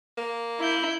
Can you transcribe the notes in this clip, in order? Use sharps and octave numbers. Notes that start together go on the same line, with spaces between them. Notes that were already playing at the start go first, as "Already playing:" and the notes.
A#3
E4 G6